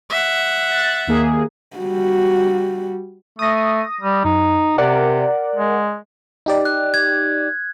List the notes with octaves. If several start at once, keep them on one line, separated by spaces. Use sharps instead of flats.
E5 F#5
F#6 A6
D#2 A#3 G#4
G3 F#4
A3 D#6 A#6
G3
F#2 D#4
C3 A#4 D5 F#5
G#3
D#4 G4 D5
F#6
G#6